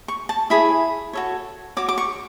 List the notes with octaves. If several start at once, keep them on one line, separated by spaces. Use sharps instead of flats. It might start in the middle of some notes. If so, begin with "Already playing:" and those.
C#6
A5
E4 G#4 C#5 B5
F#4 A4 C#5
F#4 C#5 D6
D6
C#6